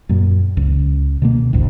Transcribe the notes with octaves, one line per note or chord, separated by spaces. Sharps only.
F#2 A#2
C#2
B2 D3 A#3
G#1 D2 A2